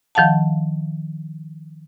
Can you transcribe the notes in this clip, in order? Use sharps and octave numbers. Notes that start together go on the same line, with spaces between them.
D#3 F3 F5 F#5 A5